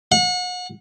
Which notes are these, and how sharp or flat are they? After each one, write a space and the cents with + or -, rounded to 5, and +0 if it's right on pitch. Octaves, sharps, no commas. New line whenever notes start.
F#5 -35